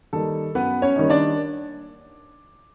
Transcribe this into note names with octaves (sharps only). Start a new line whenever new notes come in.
D#3 G3 A#3 D#4 A4
F#2 B3 B4
C#4 C#5
D#3 G3 A#3 D#4
D4 D5